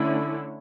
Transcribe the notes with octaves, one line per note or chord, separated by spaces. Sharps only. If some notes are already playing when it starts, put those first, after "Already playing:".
Already playing: D3 A3 C#4 E4